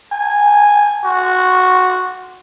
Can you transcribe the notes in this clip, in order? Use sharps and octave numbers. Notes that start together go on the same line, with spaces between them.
G#5
F#4